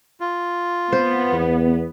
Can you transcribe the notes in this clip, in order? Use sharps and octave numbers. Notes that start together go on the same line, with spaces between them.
F4
B3 C5
E2